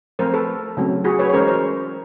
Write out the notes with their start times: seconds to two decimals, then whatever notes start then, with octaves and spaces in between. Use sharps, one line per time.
0.19 F3 A3 C4 A#4 C5
0.34 A4 B4
0.77 C#3 F#3 A3 C4
1.04 F#4 G#4
1.19 B4 C#5
1.30 C#5
1.33 E3 G#3 C#4 A#4 C5
1.48 A#4 C5